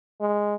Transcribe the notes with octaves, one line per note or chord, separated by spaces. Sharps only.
G#3